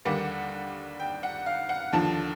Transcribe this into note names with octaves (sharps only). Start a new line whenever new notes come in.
D#2 D3 G3 A#3 D4 F#5
G5
F#5
F5
F#5
D#2 D3 F3 A5